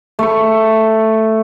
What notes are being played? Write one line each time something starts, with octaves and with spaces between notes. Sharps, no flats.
A3 C#6